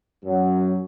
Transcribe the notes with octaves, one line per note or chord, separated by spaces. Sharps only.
F#2 F#3